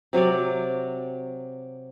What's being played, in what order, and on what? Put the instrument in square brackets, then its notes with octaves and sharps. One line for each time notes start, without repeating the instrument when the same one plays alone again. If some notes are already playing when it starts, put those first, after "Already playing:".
[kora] C3 F#3 C#5 D5